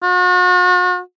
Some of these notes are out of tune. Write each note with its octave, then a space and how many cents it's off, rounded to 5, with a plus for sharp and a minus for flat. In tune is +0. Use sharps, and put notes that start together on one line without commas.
F#4 -40